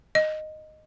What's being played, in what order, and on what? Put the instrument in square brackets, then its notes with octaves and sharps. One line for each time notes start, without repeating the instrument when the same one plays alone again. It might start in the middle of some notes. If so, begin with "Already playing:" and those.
[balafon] D#5